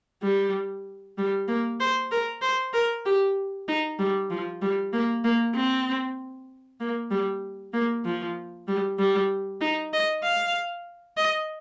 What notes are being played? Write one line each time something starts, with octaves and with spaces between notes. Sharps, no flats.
G3
G3
A#3
C5
A#4
C5
A#4
G4
D#4
G3
F3
G3
A#3
A#3
C4
A#3
G3
A#3
F3
G3
G3
D#4
D#5
F5
D#5